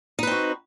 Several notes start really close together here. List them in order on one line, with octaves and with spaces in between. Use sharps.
D#4 B4 C4 F#4